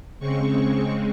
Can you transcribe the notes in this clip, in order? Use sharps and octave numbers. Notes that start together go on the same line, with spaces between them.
C#3 G#3 C4 C#6